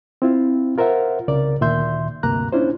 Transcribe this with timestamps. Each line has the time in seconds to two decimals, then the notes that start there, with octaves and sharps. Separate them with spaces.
0.22 C4 E4 F4
0.78 F4 A#4 C5 E5 F#5
1.28 C2 C#3 A#4 D5
1.61 D2 A#2 D#3 E5 C6 G6
2.23 D2 G2 C3 A#3 A#5 F#6
2.52 C#4 D4 E4 F4 C5